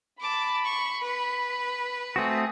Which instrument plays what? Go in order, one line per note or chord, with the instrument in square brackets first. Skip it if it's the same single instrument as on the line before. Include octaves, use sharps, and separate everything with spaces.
[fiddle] A5 D6 [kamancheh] B5
[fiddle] C#6
B4
[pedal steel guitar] A3 C4 F#4 [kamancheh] G#5 D#6